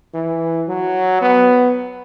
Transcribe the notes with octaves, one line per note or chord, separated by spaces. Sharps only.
E3
F#3
B3